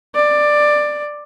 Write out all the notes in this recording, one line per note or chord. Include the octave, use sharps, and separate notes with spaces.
D5